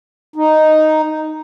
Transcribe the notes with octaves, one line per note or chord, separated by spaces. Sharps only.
D#4